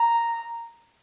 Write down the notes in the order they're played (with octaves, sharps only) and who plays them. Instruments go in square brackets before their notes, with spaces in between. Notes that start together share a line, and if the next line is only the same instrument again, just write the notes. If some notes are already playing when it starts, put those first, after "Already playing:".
Already playing: [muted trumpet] A#5